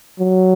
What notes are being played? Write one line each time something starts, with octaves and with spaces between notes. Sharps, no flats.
F#3